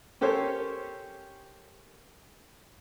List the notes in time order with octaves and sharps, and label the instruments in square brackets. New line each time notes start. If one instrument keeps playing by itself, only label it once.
[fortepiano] C#4 G4 A4 A#4 C5 C#5